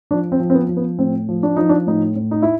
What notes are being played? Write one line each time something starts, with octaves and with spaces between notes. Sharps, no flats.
F3 D4
C4
F3
C4
B3
F3
B3
A2 C4
F3
D4
F3 D#4
D4
A2 D#4
A2
D#4
E4